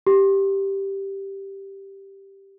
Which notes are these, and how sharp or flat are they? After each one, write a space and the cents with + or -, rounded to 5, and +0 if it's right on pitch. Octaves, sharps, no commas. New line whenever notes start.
G4 +0